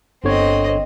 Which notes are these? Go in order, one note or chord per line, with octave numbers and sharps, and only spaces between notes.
G1 D3 C4 C#5 D#5